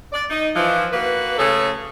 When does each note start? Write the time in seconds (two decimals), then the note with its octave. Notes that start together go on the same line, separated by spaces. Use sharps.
0.13 D5
0.29 D#4
0.54 E3 F3
0.92 A#3 F#4 B4
1.38 C#3 A3 G#4 A4 C#5